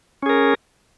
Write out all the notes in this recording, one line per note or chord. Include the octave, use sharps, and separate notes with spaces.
C#4 G#4 A#4